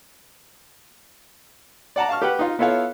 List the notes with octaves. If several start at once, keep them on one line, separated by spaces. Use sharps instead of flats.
D5 F#5 A5 A#5
F5 A5 C#6 F6
G4 B4 F#5
D#4 F4
B3 E4 F4 A4 C#5 F5